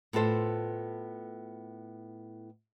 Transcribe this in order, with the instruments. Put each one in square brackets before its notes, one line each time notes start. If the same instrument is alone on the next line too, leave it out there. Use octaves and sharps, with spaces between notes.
[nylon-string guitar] A2 B3 F4 A4 C5